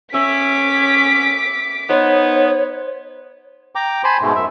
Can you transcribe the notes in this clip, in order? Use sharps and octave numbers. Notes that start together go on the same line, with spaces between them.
C#4 E5 D6 B6
B3 D#4 C5 C#5 B5
G5 A#5 D6
C5 G#5 A5 B5 C6
G#2 B2 G#3 A3
F#2 E5